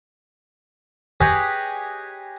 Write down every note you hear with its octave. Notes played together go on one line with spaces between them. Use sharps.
G4 G#4 B4 C#5 D#5 B5